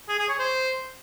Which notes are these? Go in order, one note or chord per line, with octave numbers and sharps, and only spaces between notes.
G#4
G#4
C#5
C5